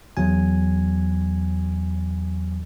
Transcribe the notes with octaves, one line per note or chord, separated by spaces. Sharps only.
E2 F#3 G#5